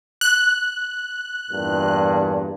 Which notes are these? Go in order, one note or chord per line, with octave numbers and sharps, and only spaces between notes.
F#6
E2 G2 A#2